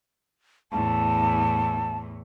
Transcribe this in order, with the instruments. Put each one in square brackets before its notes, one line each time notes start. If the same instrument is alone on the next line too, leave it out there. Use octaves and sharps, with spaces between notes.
[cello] E2 A2 [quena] A5